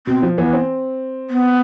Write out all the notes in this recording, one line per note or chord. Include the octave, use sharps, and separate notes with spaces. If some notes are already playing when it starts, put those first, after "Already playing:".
B2 C4
F3
E3 B3
C4
B3